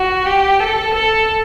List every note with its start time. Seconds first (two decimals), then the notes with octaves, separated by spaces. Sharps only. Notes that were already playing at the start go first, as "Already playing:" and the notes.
Already playing: F#4
0.26 G4
0.60 A4
0.94 A4